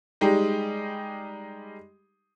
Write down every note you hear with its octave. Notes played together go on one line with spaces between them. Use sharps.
G3 G#3 D#4 G4